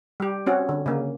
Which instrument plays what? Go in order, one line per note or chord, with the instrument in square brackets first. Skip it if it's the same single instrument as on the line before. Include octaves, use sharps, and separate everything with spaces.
[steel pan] G3 G4
C4 C#4 F#4
D3
C#3 A#3